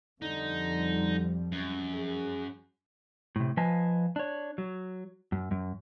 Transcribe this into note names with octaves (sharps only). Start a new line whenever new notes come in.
F2 D3 F3 G3 D#4
F#2
G#4
A2 C3
F3 B4 D#5 F5 G#5 A5
D4 C#5
F#3
F#2
F#2